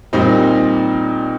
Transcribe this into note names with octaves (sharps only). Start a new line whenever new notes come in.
A#2 G3 C4 D#4